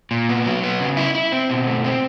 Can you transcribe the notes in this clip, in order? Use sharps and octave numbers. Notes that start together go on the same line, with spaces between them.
A#2
B3
F#3
B3
C#3
E4
E4
C4
B2
A3
C4